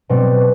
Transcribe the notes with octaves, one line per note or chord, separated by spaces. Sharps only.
B2 G3 C4